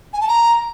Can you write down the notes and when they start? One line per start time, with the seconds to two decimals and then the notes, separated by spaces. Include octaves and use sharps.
0.13 G#5
0.21 A5
0.28 A#5